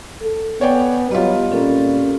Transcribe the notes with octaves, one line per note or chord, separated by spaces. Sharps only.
A4
B3 C#5 D5 G5 G#5
F#3 G3 B3 F4 D#5
A#2 C4 C#4 A4